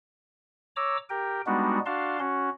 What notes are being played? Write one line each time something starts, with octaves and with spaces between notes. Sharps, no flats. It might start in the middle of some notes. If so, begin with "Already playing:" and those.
C#5 A#5 D6 E6
G4 A#4 G5
G3 G#3 B3 D4 D#4 F#4
D4 F#4 F5 A5 C6
C#4 F#4